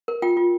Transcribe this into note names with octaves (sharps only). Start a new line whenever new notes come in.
A#4
F4 G5
F4